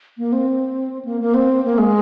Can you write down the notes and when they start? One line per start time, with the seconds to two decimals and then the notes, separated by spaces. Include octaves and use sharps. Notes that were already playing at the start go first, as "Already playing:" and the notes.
0.18 A#3
0.33 C4
1.05 A#3
1.21 A#3
1.34 C4
1.65 A#3
1.78 G#3